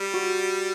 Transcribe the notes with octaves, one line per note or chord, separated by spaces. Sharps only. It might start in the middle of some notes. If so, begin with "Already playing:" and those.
Already playing: G3
F#4
F#4